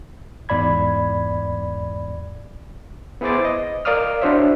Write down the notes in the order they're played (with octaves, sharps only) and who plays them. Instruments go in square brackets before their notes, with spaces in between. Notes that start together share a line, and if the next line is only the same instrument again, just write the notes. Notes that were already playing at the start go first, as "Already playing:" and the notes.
[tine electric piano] E2 G#2 D5 B5 G#6
[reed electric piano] B3 E4 G#4 C5 D6 A6
D#5
A#4 D5 F5 D6 D#6 F6
D4 E4 F#4 C5 C#5 E5